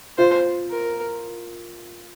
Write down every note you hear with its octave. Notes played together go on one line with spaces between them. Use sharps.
F4 C5
A#4